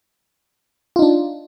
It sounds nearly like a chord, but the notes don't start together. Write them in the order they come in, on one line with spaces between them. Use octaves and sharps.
F4 D#4 D4